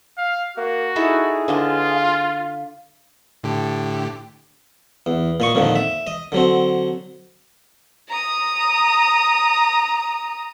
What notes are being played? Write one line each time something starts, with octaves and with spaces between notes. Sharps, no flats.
F5
A#3 F#4
D#4 E4 G#4 A4
D3 D4 F4 B4 C#5 D#5 F5
F5
A2 D3 G4
E2
A#2 D#5 C#6
F2 A#2 D3 D#3
E5
D#5
D3 F#3 C4
A#5 D#6